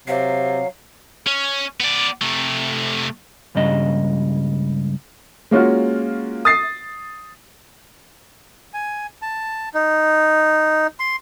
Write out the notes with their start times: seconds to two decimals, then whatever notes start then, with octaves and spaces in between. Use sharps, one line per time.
0.08 C3 F#3 F5
1.27 C#4
1.80 B3 D5
2.21 C3 A3
3.55 C#2 G2 C#3 G3 D#5
5.51 G#3 A#3 C#4 F4 F#4
6.45 D#6 A6 C7
8.74 G#5
9.22 A5
9.74 D#4
11.00 C6